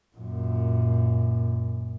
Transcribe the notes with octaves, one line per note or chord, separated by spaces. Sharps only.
F#2 A#2